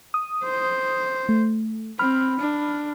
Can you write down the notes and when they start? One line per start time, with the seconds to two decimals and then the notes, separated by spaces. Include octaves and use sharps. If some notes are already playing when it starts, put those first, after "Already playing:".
0.14 D#6
0.44 C5
1.29 A3
1.99 C4 B5 F6
2.39 D4